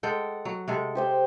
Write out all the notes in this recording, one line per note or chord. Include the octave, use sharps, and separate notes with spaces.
G#3 A4 F#5 G5
F#3
C3 G#3 A4
G4 C5 G5